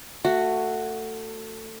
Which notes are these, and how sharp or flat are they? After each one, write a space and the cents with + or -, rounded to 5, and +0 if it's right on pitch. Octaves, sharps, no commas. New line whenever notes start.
A3 +20 F#4 +0